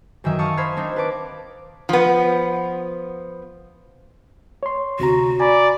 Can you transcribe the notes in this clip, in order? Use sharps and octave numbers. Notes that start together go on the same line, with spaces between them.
F#2 D#3 E3 E5 D#6
F5 A5 C#6 D#6 F6
C5 F5 B5 F6 G#6 C7
C4 D4 D#4
B4 A5 D6
F3 B3
C#5 C6
D2 C3 F#4 A#5
D5 G#5 A#5 B5